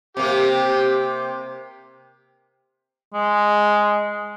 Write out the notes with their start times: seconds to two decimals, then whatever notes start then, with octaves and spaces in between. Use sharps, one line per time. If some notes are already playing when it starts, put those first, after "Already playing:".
0.17 C3 A#3 G4
3.14 G#3